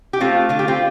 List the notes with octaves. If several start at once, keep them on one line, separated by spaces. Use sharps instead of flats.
G4
A3 C4 F4
D3 F4
G4
C4 F4